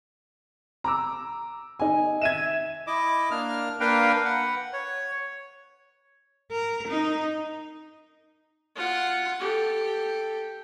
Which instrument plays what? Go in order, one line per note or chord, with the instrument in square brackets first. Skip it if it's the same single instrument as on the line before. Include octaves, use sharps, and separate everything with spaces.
[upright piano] A#5 D6 E6
D#4 G#5
[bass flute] E5 [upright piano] G#6 D#7 E7
[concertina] E4 D#5 D6
A#3 D4 F6
A#3 D4 A#4 B4 F5 G5
B4 F#5
C#5
[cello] A#4
D#4
[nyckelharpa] F4 F#5
G4 A4